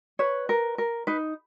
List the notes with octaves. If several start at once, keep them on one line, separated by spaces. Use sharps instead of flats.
B4 C#5
A#4
A#4
D#4 B4